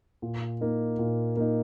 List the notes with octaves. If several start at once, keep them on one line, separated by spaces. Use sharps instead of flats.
A#2
A#3 D#4
A#2
A#3 D#4